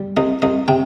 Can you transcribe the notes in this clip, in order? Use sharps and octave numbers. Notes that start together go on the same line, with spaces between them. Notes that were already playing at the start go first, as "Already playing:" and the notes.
Already playing: G3
C2 D#5
C2 D#5
C3 G5